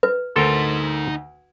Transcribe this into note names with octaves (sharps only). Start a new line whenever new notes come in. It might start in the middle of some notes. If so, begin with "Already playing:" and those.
B4
D2 D#4 A4 A#4 C5 C6